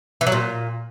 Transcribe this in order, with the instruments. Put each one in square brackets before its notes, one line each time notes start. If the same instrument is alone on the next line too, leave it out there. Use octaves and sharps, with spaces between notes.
[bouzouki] E3
F#3
A#2